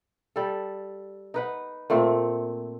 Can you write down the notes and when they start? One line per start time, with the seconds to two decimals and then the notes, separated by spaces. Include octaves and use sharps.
0.36 G3 A4
1.34 D#4 B4 F#5
1.90 A#2 A3 C4